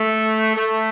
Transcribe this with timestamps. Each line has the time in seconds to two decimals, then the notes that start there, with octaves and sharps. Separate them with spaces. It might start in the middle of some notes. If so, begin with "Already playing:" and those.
Already playing: A3
0.56 A3